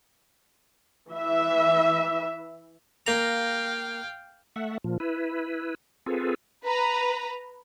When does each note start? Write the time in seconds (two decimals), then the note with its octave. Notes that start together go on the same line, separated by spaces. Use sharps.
1.12 E3 E5
3.07 A#3 F5 G5 A#5
4.56 A3 E5 F#5
4.84 A#2 F3
5.00 E4 B4
6.06 C4 F4 G#4 A4 B4
6.65 B4 A#5